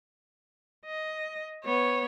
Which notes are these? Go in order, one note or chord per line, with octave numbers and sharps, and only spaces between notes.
D#5
B3 C#5